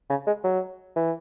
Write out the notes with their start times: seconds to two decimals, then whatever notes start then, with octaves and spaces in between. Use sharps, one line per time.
0.10 C#3
0.27 G#3
0.44 F#3
0.96 E3